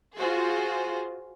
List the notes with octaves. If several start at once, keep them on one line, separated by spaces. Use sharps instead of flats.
F4 F#4 G#4 C5